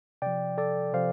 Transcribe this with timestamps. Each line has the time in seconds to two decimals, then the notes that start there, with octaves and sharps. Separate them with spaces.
0.22 C3 F3 D5 G5
0.58 A4 D5
0.93 C3 F3 C5 F5